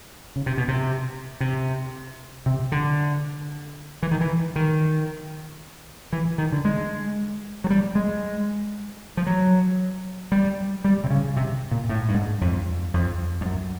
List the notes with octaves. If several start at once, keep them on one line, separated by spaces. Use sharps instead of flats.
C#3
C3
B2
C3
C3
C3
D3
E3
D#3
E3
D#3
E3
D#3
D3
G#3
F#3
G3
G#3
F3
F#3
G3
G3
C3
C#3
C3
A#2
A2
G2
G#2
F2
F2
F2
F#2